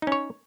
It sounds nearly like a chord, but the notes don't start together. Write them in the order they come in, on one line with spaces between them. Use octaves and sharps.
D#4 C#4 C#5